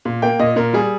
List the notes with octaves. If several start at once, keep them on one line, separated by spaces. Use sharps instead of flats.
A#2
A#3 G5
A#2 D#5
A#2 A#4
G3 G#4